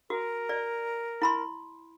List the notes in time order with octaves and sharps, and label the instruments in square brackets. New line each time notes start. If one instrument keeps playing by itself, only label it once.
[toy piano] F#4 [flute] A#4
[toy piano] D5
E4 B5 C6